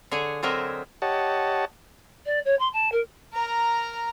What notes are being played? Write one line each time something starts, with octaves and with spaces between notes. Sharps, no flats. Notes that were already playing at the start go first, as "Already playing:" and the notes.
D3 G#4 C#5 G#5
D3 F#3 C4 A#4 D#5 E5
G4 C#5 D#5 F#5 A5
D5
C#5
C6
A5
A#4
A#4 A#5